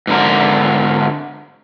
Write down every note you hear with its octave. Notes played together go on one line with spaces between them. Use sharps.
G#2 D3 A#4